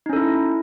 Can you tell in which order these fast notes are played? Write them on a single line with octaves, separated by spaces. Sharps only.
D#4 C#4 A4 E4